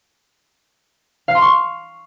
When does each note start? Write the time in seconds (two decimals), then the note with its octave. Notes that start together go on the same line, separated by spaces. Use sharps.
1.28 F5
1.35 C6
1.42 C#6